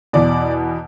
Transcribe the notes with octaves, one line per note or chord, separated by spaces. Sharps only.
E2 B2 D5